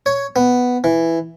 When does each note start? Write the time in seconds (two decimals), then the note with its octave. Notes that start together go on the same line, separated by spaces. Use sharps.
0.06 C#5
0.36 B3
0.84 E3